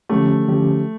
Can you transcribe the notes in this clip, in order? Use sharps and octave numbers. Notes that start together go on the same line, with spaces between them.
D3 F3 A3 C#4 G4
D3 F3 C#4 G4